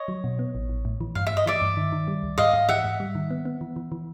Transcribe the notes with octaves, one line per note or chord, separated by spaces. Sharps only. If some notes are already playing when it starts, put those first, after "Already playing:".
Already playing: C#5 D#5
F#3
B2
B3
A1
A1
A2
E3
G2 F5
G2 E5
D#5
E3 D5 E5
G2
D#3
D#3
G3
C#2
G#2 D#5 F5
G#2
E3 E5 F#5
G#2
G3
D#3
B3
B3
E3
E3
E3